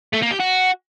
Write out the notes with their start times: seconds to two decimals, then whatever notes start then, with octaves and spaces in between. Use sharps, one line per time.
0.13 A3
0.22 A#3
0.31 G4
0.40 F#4